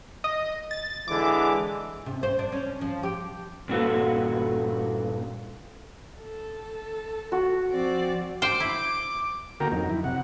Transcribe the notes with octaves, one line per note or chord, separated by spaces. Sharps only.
D#5
A6
D3 E3 G#3 D6
C3
C5
D4
C#4
F3
G4
G2 A#2 F#4 A4 B4
A4
F#4
F3 C4 D5
C5 G5 D6
E4
D3 A#3 F#4 A#4 G5 A#5
F2 F#3 D#4
E4
C3 F#5